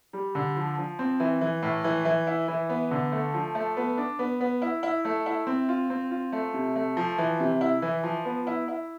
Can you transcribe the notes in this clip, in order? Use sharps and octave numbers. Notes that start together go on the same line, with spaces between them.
G3
D3
F3
F3
C4
E3
E3
A2
E3
E3
E4
E3
B3
D3
A3
F3
A3
B3
D4
B3
B3
E4
E4
A3
E4
C4
F4
C4
F4
A3
C3
A3
F3
E3
C3
E4
E3
F3
B3
E4
E4